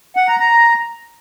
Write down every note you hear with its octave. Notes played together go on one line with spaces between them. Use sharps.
F#5
A#5
A#5